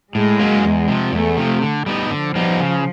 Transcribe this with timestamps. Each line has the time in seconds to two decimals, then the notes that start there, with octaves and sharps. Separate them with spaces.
0.15 A2 G#3
0.39 F#3 A#3 C#4
0.64 E2
0.88 C3 F3
1.12 E2 A3
1.37 C3 F3
1.62 D3
1.86 G3 B3 D#4
2.10 D3 F3
2.35 G3 B3 D#4
2.60 C#3